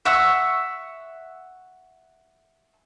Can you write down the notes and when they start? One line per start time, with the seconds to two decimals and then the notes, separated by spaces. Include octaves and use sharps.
0.05 E5 F#5 C#6 E6